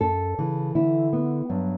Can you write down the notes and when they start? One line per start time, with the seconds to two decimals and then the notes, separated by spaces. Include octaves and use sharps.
0.01 F#2 A4
0.38 C#3 E3
0.75 D3 E4
1.13 B3
1.50 G2 F#3